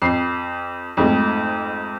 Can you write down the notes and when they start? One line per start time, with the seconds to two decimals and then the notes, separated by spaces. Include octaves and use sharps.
0.02 F2 C7
0.97 F2 G#2 A3